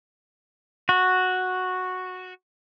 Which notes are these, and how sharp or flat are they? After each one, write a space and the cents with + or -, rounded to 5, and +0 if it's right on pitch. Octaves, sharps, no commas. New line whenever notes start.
F#4 -5